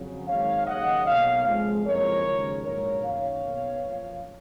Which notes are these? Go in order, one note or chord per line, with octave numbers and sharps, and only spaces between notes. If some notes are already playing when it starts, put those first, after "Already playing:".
Already playing: F2 C#3 F#3
G#1 G#2 D#3 F#3 A#3 C#5 F5
D#2 C#3 F#3 A#3 D#5 F#5
B1 B2 F#3 A#3 C#5 F5
F#1 F2 F3 G#3
F#1 F2 F3 G#3 A#4 C#5
D#2 C#3 F3 G#3
A#1 G#2 F#3 A#3 A#4 C#5
F#2 D#3 F#3 A#3 C#5 F5
B1 B2 A#3
F#2 F3 A#3